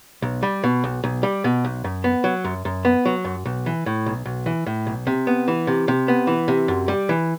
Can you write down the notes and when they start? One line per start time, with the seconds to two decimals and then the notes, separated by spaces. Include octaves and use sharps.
0.22 B1
0.43 G3
0.64 B2
0.84 B1
1.04 B1
1.23 G3
1.44 B2
1.65 B1
1.84 F#2
2.04 B3
2.24 F#3
2.44 F#2
2.65 F#2
2.85 B3
3.05 F#3
3.25 F#2
3.45 B1
3.66 E3
3.86 A2
4.06 B1
4.26 B1
4.46 E3
4.66 A2
4.87 B1
5.07 C3
5.27 B3
5.48 E3
5.67 C3
5.88 C3
6.08 B3
6.27 E3
6.48 C3
6.68 F#2
6.88 G3
7.09 E3